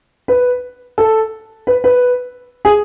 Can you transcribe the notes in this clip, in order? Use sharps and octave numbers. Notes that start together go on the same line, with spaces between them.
B4
A4
B4
B4
G#4